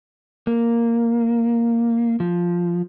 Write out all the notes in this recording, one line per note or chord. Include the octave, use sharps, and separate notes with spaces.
A#3
F3